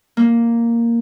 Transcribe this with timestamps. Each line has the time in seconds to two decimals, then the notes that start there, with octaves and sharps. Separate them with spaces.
0.17 A#3